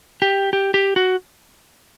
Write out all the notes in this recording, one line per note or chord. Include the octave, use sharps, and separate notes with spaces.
G4
G4
G4
F#4